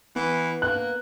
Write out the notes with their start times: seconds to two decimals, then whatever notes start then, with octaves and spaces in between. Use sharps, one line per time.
0.16 E3 B3
0.62 A#3 F#6